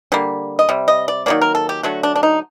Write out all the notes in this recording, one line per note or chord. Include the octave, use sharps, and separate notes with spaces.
D3 G3 A#3
D#5
C3 G3
D#5
D5
D#3 F#3 A#3 D5
A#4
A4
G4
D3 F#3 A3 F#4
D4
D4
D#4